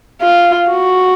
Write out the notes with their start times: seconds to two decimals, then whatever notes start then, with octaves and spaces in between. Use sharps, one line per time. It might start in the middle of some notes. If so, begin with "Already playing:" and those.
0.22 F4
0.69 F#4